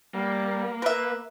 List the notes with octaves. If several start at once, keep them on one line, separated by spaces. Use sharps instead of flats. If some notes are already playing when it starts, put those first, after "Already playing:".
G3 A#3
A#4 B4 E5